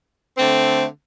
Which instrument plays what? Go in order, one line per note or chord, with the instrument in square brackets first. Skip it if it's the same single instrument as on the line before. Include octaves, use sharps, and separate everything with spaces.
[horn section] D3 A3 C4